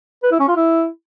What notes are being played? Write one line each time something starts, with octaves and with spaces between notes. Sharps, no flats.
B4
E4
C#4
F4
E4